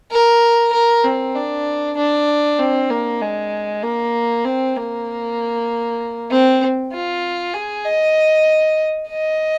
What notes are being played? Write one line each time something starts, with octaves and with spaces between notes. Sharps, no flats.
A#4
A#4
C4
D4
D4
C4
A#3
G#3
A#3
C4
A#3
C4
F4
G#4
D#5
D#5